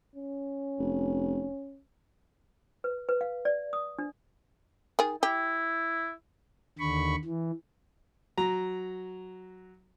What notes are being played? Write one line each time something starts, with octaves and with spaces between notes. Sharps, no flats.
C#4
F1
B4
B4
F5
D5
D#6
D4
D#3 G#4
E4 G4
D#2 D3 B5 C#6
E3
F#3 A#5